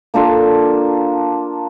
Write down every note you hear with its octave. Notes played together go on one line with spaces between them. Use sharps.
A#3 D4 F4 A4